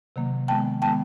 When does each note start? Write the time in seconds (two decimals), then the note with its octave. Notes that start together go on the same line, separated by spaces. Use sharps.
0.16 C3 D#3 F#3 A#3
0.48 D#3 G#3 B3 G5 A5
0.82 D#3 G#3 B3 G5 A5